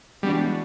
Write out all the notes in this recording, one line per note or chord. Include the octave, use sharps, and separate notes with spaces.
E3 G3 G#3 B3 D4 F#4